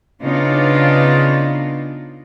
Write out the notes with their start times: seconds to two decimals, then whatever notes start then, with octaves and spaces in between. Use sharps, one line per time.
0.20 C#3 B3 D4 D#4 F4